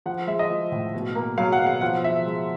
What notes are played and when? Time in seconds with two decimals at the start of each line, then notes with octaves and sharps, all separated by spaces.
0.06 F3 F#5
0.27 G#3 E5
0.39 D#5
0.50 F3
0.72 A2
0.94 B2
1.15 A#3
1.38 F#3 F5
1.52 F#5
1.60 B2
1.67 F5
1.81 F3 F#5
2.04 F3 E5
2.26 G#3